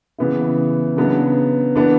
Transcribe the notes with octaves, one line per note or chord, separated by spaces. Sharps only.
C#3 E3 B3 E4
C#3 F#3 B3 D4
E3 B3 D4